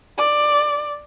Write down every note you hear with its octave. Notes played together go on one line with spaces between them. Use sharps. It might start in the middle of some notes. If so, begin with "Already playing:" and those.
D5